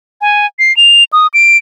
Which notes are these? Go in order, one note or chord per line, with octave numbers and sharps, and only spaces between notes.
G#5
C7
F7
D#6
D7